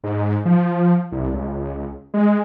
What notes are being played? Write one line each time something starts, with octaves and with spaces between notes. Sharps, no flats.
G#2
F3
C2
C#2
G#3